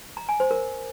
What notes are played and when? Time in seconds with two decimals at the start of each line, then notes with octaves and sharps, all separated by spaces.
0.17 A#5
0.29 G#5
0.40 C5
0.51 A#4